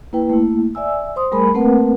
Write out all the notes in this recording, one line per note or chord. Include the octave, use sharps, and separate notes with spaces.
A#3 E4 B4 G5
A3 A#3 E4
D5 E5 G#5 E6
C5 C6 D#6
G3 A3 G#4 A#4 G#5 B5
A3 A#3 C4 A#4 B4 F#5